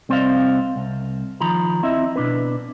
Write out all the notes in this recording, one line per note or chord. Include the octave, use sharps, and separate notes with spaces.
C2 C4 C5 D5 D#5 F5
C2
D#3 F3 A#5 B5
C4 E4 D#5 E5
B2 D4 B4